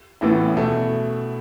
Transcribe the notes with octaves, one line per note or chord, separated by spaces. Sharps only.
A1 A2 E3 B3 E4
B2 A3